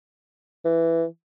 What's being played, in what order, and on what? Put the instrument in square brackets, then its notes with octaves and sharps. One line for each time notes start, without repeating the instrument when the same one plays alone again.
[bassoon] E3